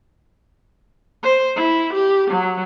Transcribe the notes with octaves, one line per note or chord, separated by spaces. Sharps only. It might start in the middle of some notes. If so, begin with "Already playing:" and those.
C5
E4
G4
F#3